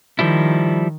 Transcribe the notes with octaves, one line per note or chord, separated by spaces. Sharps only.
D#3 F3 G3 E4